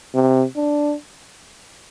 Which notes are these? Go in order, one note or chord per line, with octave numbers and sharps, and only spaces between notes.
C3
D4